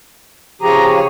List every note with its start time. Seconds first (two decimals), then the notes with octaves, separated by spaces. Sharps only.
0.62 C#3 F3 G4 G#4 C#5 A#5